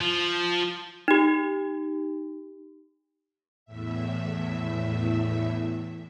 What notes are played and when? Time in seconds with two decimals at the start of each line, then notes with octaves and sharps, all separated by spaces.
0.01 F3
1.08 D#4 G4
3.65 E2 A2 E5